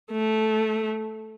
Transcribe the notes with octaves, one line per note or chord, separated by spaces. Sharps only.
A3